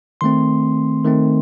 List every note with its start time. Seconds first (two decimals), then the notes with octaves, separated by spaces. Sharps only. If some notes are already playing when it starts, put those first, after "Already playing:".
0.21 D#3 A3 C4 C6
1.05 D#3 A3 C4